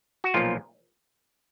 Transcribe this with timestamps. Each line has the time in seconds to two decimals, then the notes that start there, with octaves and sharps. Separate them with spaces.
0.24 F#4
0.34 B1 A#2 F3 F4